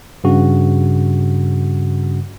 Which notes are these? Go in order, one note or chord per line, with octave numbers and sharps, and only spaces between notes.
G2 C#3 F#4